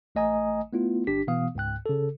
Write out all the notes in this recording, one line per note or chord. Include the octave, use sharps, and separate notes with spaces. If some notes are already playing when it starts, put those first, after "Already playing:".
A1 A3 D#5 G#5 A#5 D#6
A3 B3 E4 F4
G1 D4 G4 B6
B2 E3 B3 F5 D#6
C#2 G#2 G5 F#6
C#3 A4